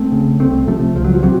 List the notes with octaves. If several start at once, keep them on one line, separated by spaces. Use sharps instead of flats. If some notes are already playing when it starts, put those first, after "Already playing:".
Already playing: A3 C4
C#3
C2 A3 C4
C3 F3 A3
C#2 F3
F#3
F3
C3 F#3